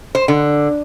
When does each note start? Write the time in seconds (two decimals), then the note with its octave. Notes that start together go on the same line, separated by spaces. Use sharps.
0.15 C5
0.28 D3